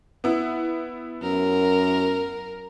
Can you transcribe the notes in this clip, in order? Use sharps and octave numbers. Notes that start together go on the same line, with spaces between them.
B3 E4
F#2 A#4